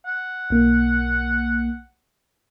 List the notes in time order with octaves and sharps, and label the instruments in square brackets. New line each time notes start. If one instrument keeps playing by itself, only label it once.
[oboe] F#5
[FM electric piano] B1 A#3